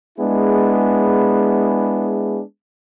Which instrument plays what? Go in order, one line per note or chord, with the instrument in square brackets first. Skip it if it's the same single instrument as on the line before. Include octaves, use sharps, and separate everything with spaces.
[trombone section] G#3 B3 D4 E4 G#4